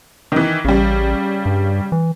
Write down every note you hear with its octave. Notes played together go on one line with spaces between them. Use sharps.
D#3 E3
A1 C#3 G3
G2
E3